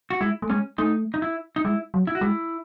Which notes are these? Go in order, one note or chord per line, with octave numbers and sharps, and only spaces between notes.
F#4
G#3 E4
A3
G#3 C#4
A3 D#4
D#4
E4
D#4
G#3 E4
F#3
E4
F#4
G#3 E4